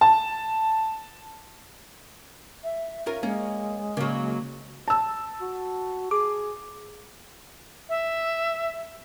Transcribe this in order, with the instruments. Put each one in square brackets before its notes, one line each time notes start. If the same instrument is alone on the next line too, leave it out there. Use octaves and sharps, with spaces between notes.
[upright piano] A5
[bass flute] E5
[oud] C#4 F4 A#4
[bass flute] G#3 [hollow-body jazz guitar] A#3 [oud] C#4
[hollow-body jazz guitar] C#3 [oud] F#3 A#3
[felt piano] A5 E6
[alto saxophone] F#4
[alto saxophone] G#4 [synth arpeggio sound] D6
[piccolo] E5